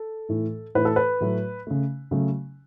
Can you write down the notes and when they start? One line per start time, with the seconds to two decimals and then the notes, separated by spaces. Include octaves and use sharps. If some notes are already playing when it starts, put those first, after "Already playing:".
Already playing: A4
0.29 A2 E3 A3
0.75 A2 E3 A3 B4
0.85 A4
0.96 B4
1.20 A2 F#3 A3
1.67 C#3 A3
2.11 C#3 F#3 A3